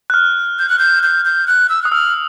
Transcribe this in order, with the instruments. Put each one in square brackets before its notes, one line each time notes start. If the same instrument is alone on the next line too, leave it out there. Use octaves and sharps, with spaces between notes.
[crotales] F#6
F6
[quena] G6
F#6
G6
G6
G6
F#6
E6
[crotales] D#6 [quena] F#6
[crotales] E6 [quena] F6